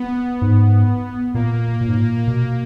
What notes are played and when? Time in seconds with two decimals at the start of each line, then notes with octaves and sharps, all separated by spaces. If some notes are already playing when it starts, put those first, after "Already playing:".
Already playing: B3
0.42 G#2
1.35 A#2 A#3
1.81 A#2
1.88 G#2
1.96 A#2
2.28 B2